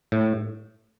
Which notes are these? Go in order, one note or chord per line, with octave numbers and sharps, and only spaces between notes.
A2